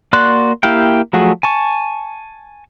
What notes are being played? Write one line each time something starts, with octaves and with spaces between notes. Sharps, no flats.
A#3 F#4 D5 C6 F#6
A#3 E4 G4 F5 G5
F3 F#3 A3 F#4 G#4
G#5 A5 C#6